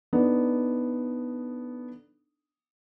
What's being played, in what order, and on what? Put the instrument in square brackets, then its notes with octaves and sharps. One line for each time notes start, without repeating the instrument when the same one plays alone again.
[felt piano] B3 D4 D#4 A4